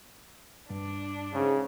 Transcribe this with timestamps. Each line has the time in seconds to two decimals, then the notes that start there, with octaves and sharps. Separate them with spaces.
0.70 G2 D4
1.33 G#2 C#3